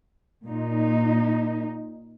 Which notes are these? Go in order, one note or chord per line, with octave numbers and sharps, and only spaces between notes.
A#2 D#4